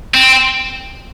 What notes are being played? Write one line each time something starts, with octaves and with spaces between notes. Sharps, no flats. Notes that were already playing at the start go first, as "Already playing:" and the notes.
C4